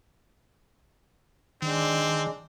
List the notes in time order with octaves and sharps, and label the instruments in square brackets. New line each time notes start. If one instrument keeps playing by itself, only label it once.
[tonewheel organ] D#3 [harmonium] G#3 D4 [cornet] C4